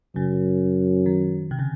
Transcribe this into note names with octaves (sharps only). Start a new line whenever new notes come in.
F#2 C#3
D#3
C3
C#3